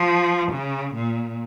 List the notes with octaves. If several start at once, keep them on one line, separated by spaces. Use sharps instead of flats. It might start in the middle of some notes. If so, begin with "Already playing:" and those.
Already playing: F3
C#3
A#2